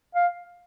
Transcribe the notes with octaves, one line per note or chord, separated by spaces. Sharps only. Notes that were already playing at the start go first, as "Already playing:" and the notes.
F5